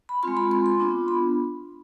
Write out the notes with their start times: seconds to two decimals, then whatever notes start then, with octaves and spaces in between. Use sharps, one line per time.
0.09 B5
0.23 G#3 C4 F4 C6
0.37 B5
0.51 C6
0.66 C6
0.80 B3 D4 F4
1.08 B5